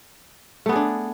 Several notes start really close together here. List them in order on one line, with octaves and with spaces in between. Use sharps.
A3 B3 G#4 D4